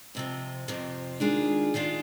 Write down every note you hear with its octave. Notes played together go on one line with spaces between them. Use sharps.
F2 C3 F3
F2 C3 F3
D#3 G#3 D4 F4 G#4
D#3 G#3 D4 F4 G#4